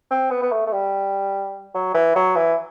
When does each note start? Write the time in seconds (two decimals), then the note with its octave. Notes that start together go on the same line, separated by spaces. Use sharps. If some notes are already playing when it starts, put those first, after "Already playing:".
0.11 C4
0.31 B3
0.42 B3
0.52 A3
0.67 A3
0.73 G3
1.75 F#3
1.95 E3
2.16 F#3
2.36 E3